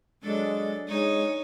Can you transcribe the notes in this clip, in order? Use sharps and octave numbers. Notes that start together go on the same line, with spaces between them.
F#3 G#3 D4 A4
G#3 D#4 C#5